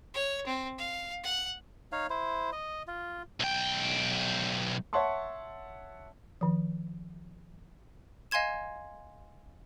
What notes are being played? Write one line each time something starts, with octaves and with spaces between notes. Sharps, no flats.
C#5
C4
F5
F#5
D#4 C#5 F5
E4 C5
D#5
F4
B1 G5
C#5 E5 F#5 A5 C6 C#6
D#3 F3
D#5 F5 G#5 C6 G#6 E7